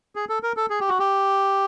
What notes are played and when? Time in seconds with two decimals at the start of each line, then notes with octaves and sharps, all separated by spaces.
0.16 G#4
0.29 A4
0.43 A#4
0.57 A4
0.70 G#4
0.80 G4
0.89 F#4
0.99 G4